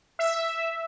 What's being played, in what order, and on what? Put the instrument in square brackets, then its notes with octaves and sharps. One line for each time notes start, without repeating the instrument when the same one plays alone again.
[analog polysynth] E5